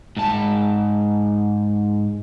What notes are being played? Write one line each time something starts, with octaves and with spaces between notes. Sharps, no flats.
G#2 A5